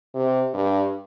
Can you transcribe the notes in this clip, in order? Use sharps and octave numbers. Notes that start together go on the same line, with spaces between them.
C3
G2